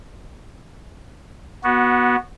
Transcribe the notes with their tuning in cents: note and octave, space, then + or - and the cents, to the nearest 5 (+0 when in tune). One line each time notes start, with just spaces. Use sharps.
B3 -20 F#4 +0